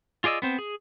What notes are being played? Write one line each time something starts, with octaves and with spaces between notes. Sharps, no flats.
F4 G#4 D5 D#5 E6
B3 C4 C5
G#4